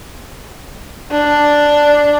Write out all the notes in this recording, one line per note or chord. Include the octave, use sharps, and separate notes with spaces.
D4